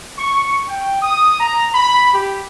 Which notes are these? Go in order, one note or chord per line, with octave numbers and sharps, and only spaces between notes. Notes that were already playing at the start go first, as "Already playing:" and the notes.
C#6
G5
D#6
A#5
B5
G4